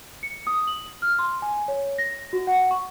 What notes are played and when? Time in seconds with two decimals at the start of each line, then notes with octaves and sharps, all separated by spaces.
0.23 C#7
0.47 D#6
0.67 F#7
1.02 F6
1.19 C6
1.42 G#5
1.68 C#5
1.98 A#6
2.33 F#4
2.47 F#5
2.71 C#6